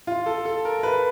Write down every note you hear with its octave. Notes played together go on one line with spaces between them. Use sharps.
F4
A4
A4
A#4
B4